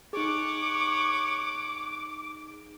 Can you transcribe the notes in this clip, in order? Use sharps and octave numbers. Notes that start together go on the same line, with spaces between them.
D#4 G#4 C#5 F#5 D6